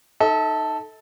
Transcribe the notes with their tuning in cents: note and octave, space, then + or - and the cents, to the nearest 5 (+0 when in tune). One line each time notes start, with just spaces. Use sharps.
D#4 +0 A4 +0 E5 -45